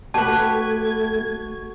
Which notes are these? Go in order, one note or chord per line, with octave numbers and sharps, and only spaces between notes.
A3 F#4 G4 B4 A5 G#6